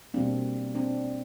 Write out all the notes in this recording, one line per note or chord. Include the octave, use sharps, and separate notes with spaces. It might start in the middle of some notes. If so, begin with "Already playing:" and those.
B2 G3 A#3 C4 D4
C4 D4